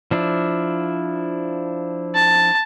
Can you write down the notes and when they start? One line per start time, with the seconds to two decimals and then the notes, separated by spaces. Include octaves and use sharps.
0.11 F3 D4 E4
2.15 A5